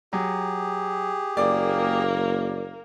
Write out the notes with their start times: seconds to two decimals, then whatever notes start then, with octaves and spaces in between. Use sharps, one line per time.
0.13 F#3 G4 G#4
1.37 F#1 A#3 A#4 D5 D6